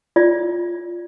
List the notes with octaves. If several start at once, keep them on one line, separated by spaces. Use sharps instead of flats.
F4 D5